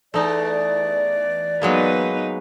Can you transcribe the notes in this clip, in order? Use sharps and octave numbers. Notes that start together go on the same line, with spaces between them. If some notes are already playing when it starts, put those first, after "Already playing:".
E2 A3 D#4 D5
F#3 G#3 A#3 B3 D#4 B4